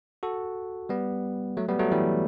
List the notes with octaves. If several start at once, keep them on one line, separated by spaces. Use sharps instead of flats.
F#4 A4
G3 B3
F#3 A3
G3 B3
F#3 A3
E3 G3